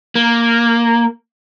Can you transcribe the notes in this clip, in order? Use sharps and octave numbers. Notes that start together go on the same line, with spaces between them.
A#3